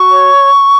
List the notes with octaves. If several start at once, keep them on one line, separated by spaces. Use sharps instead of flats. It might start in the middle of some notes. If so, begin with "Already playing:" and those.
Already playing: F#4 C#6
C#5